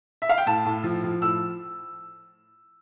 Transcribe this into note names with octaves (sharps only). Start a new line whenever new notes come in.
E5
F5
G5
A2 A5
A2
F3
F3
A2 E6